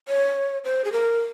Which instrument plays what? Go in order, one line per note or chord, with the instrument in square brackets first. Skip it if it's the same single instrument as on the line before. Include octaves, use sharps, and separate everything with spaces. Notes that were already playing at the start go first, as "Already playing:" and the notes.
[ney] C#5
C5
G#4
A#4